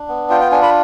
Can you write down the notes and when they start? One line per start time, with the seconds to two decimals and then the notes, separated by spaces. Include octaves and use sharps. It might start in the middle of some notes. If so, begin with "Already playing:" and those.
Already playing: D4
0.08 B3
0.30 F4 G5
0.40 G5
0.51 D4 G#5
0.62 B5